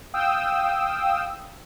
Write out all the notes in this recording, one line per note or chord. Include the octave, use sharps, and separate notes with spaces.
F5 G5 D#6 E6